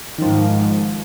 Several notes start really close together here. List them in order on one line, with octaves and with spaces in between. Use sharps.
D#3 F3 G#2